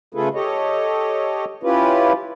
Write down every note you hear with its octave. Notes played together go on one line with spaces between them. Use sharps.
C#3 A3 F4 G#4 A4 B4
G4 A4 C#5 D#5
C#4 E4 F4 G4 B4